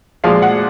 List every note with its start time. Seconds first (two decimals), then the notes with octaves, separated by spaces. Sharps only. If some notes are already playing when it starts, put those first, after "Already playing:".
0.24 A#2 F3 G#3 F5
0.42 F#5